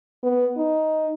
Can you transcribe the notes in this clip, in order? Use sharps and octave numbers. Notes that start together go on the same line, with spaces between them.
B3
D#4